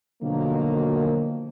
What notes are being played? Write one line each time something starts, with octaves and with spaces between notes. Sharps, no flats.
B2 D3 D#3 F3 F#3 A#3